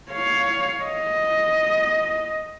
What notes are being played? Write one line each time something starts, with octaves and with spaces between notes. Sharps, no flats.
C#5 F5
D#5